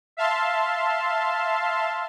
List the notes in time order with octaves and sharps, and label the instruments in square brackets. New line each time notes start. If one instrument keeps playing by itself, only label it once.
[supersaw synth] E5 F5 A5 C6